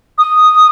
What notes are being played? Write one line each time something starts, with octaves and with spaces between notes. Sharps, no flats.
D#6